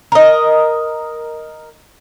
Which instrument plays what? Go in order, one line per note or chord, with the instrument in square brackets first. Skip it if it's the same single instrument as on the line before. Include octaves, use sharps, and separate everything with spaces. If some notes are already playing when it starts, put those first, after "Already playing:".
[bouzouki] A#4 D#5